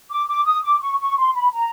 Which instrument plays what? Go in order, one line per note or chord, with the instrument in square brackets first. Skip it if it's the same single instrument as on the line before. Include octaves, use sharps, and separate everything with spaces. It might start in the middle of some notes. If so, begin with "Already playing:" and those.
[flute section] D6
D6
D#6
D6
C#6
C#6
C6
B5
A#5